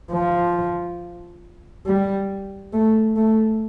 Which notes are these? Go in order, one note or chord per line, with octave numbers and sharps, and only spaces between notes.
F3
G3
A3
A3